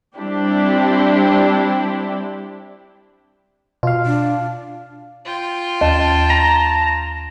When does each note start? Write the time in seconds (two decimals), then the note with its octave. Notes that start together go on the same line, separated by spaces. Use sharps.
0.17 G3 C4 D4 E4 G4
3.83 B2 F4 F5
4.06 D4
5.25 F4 G5
5.81 D#2 A5
6.30 A#5